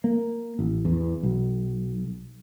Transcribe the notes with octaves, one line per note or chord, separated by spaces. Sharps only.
A#3
A1
E2
B1